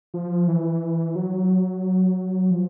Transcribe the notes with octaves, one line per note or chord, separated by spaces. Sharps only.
F3
E3
F#3
F3